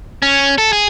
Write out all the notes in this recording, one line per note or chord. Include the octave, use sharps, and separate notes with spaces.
C#4
A4
G#4